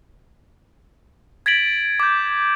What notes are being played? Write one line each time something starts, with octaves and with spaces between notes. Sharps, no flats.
G#6 A6 B6 D7 F#7
D6 G6